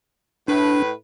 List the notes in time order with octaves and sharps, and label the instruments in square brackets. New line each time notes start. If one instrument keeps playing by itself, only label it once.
[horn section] A2 B4 [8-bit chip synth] D4